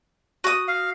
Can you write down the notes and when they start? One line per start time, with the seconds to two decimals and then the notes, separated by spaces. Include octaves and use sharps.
0.44 F#4 D#6
0.68 F5